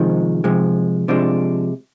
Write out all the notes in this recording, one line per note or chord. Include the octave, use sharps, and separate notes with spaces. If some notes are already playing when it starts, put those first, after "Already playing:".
Already playing: C3 D#3 F3 G#3 D#4
C3 F3 G#3
C3 F3 G#3 D4